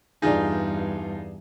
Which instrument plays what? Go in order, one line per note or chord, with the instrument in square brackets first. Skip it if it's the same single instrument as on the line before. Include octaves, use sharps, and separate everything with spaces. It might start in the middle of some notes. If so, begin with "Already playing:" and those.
[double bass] E2 G2 [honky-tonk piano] D4 G#4 [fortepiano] D#4 F4